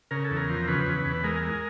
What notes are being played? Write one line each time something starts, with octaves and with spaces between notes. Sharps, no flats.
C#3 A#4
A4
E2
A#4
F3
C#3 B4
E2
E2
G#3 A#4
G#3